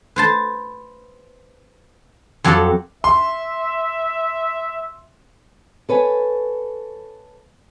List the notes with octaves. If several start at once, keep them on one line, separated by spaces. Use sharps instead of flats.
B4 C5 A5
F2 F#3 C4 G4 A4 F#5
E5 C6
A4 B4 C#5 G#5